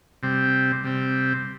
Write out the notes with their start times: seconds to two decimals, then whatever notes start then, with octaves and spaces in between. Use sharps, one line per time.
0.23 C3 G3 C4
0.84 C3 G3 C4